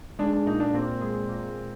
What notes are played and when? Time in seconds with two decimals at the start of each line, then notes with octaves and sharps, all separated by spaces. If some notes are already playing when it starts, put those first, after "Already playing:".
0.19 G#3 D4
0.33 D4
0.46 A#2 D#4
0.60 D4
0.74 A#2 C4
1.01 G#3
1.29 A#2